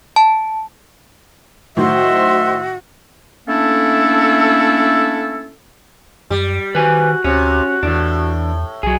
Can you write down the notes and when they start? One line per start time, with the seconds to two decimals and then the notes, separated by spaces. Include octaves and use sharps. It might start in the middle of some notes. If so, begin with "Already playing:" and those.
0.16 A5
1.77 A2 D#3 F#3 F#4 C5 D#5 E5 C6
3.47 A3 A#3 C#4 D4 E4 A4
6.30 F#2 G3
6.75 D#3 F#4 B4 C5 G#5
7.24 D2 C3 C#4
7.83 E2 A2 E3 D4
8.83 B1 F#3 G#4